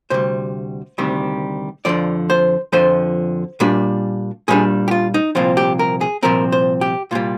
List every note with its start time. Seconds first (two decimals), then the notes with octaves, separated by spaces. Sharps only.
0.10 D2 C3 G3 C5
0.98 D2 C3 D#3 G3
1.85 F2 D3 F3 D5
2.30 C5
2.72 F2 D3 F3 C5
3.60 A#2 G3 D4
4.48 A#2 G3 D4 G#4
4.88 G4
4.91 F4
5.14 D#4
5.35 C2 A#2 F3 C4 F4
5.57 G4
5.79 A#4
6.01 G#4
6.23 C2 A#2 F3 C4 A#4
6.52 C5
6.81 G4
7.11 C2 A#2 G3 F4